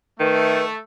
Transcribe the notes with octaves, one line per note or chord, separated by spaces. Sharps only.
D#3 A3 B4